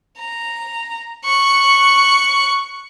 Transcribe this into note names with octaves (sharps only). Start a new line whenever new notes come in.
A#5
C#6 F#6